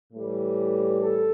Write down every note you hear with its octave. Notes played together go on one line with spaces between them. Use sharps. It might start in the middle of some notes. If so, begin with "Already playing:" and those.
A2 E3 G3
A4